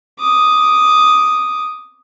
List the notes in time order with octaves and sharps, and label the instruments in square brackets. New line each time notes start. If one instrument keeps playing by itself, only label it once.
[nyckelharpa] D6 D#6